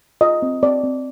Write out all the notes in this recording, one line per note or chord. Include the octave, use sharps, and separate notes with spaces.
F4 D#5
C4
C4 D5
C4